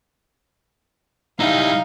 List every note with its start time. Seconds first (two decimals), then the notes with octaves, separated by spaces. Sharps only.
1.40 G3 D#4 E4 F5